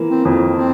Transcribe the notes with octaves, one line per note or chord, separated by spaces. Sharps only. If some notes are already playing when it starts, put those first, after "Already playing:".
Already playing: E3 A#3
C4
F2
C4